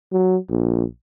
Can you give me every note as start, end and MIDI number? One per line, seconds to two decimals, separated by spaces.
0.12 0.37 54
0.50 0.84 34